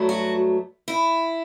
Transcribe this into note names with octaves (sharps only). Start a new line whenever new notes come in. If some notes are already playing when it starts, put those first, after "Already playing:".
Already playing: G2 F#3 A3
F#4
E4